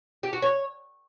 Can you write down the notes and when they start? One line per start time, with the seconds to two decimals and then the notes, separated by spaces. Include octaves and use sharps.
0.23 G4
0.33 F#4
0.42 C#5